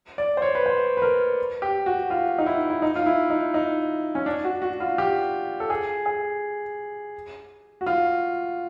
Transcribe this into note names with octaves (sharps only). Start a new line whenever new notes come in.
D5
C5
C#5
B4
C5
B4
A#4
G4
F#4
F4
D#4
E4
E4
D#4
F4
E4
D#4
D#4
C#4
D4
F#4
F#4
F4
G4
A4
G#4
G#4
F#4
F4